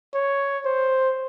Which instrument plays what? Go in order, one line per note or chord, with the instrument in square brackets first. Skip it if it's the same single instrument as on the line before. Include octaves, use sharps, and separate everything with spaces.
[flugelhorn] C#5
C5